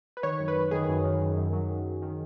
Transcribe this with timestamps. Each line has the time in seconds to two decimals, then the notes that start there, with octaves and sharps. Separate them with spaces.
0.17 B4
0.23 D#3 C#5
0.40 F#2
0.48 B4
0.56 F#2
0.71 D#3 G#4
0.89 F#2
1.04 D#3
1.21 F#2
1.36 F#2
1.53 F#3
1.69 D#3
1.86 F#3
2.02 D#3